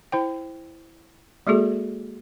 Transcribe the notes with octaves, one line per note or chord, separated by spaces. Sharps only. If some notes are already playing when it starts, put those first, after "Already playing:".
E4 C5 G5
G#3 A#3 F#4 G#4 A4